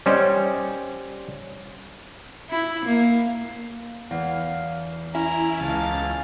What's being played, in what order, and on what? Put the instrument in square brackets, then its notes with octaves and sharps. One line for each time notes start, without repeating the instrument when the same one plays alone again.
[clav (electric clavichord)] G3 C#4 C5 D#5
[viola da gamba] E4
A#3
[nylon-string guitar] E2 [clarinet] F5
[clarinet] C#4 [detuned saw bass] E4 [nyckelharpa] A#5
[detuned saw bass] C#2 [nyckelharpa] F5 A5